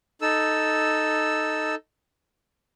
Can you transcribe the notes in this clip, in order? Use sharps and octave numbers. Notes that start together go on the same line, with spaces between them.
D#4 A4 E6